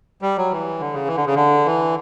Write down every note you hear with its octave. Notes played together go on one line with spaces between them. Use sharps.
G3
F#3
E3
D3
C#3
E3
D3
C#3
D3
E3